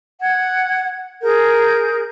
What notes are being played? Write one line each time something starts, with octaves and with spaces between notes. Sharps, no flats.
F#5 G#6
G#4 A#4 G6